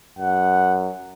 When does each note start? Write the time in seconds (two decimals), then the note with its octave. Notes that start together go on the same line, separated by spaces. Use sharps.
0.19 F#2 F#5